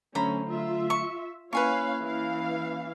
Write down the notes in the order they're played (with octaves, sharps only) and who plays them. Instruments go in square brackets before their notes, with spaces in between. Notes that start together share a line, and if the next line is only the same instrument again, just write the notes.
[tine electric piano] D3 F#3 A3 [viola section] C#4 [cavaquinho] C5 A#5 B5
[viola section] F4 E5
[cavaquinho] C#6
[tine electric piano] A#3 C#4 E4 [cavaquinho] B4 G#5 C#6 [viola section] C#5 F5
[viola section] E3 F5